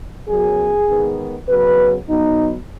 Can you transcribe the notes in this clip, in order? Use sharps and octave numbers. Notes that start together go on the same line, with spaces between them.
F#2 F#3 B3 G#4
G#2 D#3 B3
C#3 F#3 B3 B4
B2 F#3 B3 D#4